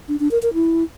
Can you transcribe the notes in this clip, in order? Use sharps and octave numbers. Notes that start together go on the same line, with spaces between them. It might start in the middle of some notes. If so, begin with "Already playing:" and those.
D4
D4
A#4
A#4
E4